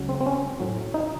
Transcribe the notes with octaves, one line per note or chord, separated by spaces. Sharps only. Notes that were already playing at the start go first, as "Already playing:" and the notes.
Already playing: C#2 C#3 F#3
C4
C4
C#4
A2 F#3
D#4